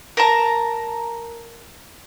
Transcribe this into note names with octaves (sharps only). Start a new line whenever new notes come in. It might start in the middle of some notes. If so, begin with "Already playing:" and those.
A#4 A5 A#5